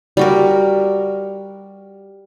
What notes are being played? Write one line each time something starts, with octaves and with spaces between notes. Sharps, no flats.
G3 F#4 A#4